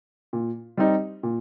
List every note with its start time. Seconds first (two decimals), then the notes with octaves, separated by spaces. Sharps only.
0.33 A#2
0.77 G3 C4 D#4 G4
1.23 A#2